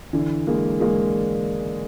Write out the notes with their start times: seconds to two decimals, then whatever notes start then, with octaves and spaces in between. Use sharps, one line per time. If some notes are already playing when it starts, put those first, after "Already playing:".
0.13 D3 E3
0.47 G#3 A#3
0.80 G#3 A#3